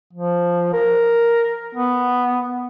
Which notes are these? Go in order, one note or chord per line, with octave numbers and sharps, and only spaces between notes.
F3
A#4
B3